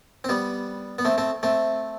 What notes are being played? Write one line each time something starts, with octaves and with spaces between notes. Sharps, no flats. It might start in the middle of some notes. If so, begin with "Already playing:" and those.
C4
G3 B3
B3
A3 C4
A3 C4
A3 C4